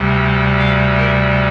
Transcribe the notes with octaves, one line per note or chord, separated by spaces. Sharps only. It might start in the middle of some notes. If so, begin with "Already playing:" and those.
Already playing: D2 C3 G3
F5
A#4